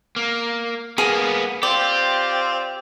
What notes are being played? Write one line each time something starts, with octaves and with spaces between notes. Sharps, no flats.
A#3
A#3 B3 G#4
C4 F4 G4 D5